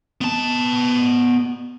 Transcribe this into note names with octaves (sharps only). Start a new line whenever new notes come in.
B3 A5